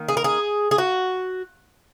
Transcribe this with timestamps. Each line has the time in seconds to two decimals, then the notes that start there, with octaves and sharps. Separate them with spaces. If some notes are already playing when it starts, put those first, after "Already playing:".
Already playing: D#3 A#3
0.08 G#4
0.17 A#4
0.24 G#4
0.71 G#4
0.78 F#4